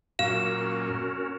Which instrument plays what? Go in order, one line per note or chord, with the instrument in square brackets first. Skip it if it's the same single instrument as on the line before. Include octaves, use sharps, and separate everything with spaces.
[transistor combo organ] F#2 A#2 [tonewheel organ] C#4 F#4 A#4 [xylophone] F5 [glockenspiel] E7